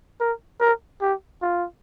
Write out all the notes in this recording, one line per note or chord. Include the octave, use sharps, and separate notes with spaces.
A#4
A#4
G4
F4